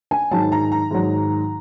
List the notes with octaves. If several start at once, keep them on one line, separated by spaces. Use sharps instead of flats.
G#5
G#2 D#3 F#3 A5
A#5
A#5
G#2 D#3 F#3